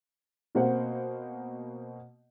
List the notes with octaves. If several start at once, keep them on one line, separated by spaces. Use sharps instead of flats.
B2 A#3 C4 C5 F#5